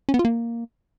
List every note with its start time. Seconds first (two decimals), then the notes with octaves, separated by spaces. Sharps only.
0.09 C#4
0.14 B3
0.19 F4
0.25 A#3